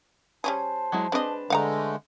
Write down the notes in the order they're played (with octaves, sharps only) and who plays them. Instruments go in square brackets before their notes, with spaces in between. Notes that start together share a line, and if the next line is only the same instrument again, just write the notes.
[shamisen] G3 C#4 G#4 [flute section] C5 A5
[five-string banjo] F#3 G#3 E4
[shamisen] G#3 D#5 [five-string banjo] C4 D4 B4
[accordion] D3 G#3 A3 [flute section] D#5 [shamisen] F5 F#5 A#5